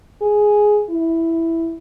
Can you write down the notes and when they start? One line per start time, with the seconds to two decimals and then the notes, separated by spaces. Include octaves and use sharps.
0.22 G#4
0.90 E4